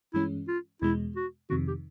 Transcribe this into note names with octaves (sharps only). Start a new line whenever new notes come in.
G2 E3 G#3 C#4 E4
F4
E2 B2 G#3 E4
F#4
F2 C3 D#3 F#4
G4